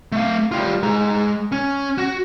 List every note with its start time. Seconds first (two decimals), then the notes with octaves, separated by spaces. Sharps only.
0.12 A3 F5
0.51 G3 F4
0.83 G#3 A#5
1.52 C#4
1.98 F#4